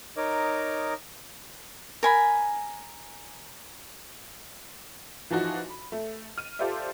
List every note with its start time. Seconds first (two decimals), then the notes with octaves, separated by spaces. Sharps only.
0.17 D#4 A#4 C#5 D#5 D6
2.03 A#4 G#5 B5
5.31 E3 F3 D#4 F#4
5.69 B5
5.92 A3
6.38 F6 D#7
6.59 F4 G4 A4 C5 D5 E5